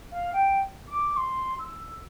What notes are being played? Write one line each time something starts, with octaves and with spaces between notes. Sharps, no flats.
F5
G5
D6
C6
E6